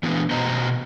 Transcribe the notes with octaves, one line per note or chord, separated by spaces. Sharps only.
E3 B3 D4
B2 B3 F#4 C5 D#5 A#5